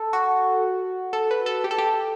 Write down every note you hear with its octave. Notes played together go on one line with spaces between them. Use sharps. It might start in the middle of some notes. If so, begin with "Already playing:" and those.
Already playing: A4
F#4
A4
B4
A4
G4
A4
G4